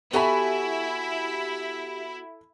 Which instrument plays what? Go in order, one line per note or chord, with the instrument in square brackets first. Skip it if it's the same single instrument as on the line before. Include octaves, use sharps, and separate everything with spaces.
[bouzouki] B3 F#4 G#5 [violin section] E4 [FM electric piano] G4 [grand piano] A4 E5 B5